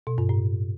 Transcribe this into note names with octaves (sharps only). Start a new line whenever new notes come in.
B2
G2
A2